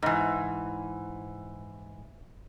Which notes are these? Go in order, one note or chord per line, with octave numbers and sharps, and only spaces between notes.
G#2 E3